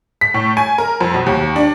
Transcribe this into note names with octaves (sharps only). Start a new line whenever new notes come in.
B6
A2
G#5
A#4
F2
B1
D#2
D4